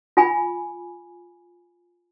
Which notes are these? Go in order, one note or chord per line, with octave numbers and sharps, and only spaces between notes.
F4 G#5 B5